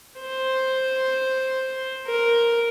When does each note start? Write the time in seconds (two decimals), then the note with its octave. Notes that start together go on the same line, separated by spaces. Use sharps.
0.19 C5
2.06 A#4